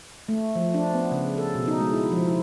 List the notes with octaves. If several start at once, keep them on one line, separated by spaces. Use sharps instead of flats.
A3
F3
D4
B3
C#3
A4
B2
D#4
G#3
E4
F3
E4